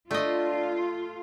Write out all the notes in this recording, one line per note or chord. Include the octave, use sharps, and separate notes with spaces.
A3 D4 F4 D#5